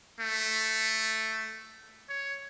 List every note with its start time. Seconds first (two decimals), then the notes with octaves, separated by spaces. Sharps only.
0.20 A3
2.09 C#5